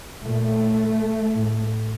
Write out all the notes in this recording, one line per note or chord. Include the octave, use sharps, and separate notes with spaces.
A#2 A3
A2